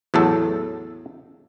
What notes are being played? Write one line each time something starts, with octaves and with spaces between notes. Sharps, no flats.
E2 A2 F#3 A4